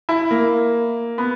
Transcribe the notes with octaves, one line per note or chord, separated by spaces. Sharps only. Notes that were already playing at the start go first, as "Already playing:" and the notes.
E4
A#3
B3